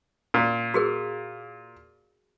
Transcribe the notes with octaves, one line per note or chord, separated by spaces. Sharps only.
A#2
F#4 G#4 A#4